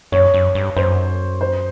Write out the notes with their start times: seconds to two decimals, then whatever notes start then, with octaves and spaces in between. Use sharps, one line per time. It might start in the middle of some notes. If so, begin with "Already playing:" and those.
0.12 F#2 C#5
0.34 F#2
0.55 G2
0.76 F#2 C5
1.41 C5